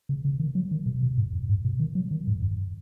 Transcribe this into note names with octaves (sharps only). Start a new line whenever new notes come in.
C#3
C#3
D#3
F#3
D#3
B2
B2
G#2
F#2
G#2
B2
D#3
F#3
D#3
G#2
F#2